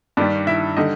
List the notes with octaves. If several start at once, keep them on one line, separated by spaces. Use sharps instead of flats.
G2 D#3 G3 D4 D5
E4 E5
D3 G3 D#4 D#5